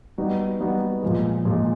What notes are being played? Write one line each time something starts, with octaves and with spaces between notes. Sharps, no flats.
G3 B3 D#4 F#4
G3 B3 D#4 F#4
A#2 F3 G#3
A#2 F3 G#3